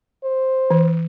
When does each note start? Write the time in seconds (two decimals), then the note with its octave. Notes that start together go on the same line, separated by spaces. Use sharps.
0.23 C5
0.71 E3